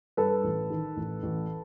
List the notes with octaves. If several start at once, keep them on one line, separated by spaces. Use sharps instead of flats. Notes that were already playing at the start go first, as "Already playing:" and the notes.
G2 A4 B4
A1
D#3
A1
A1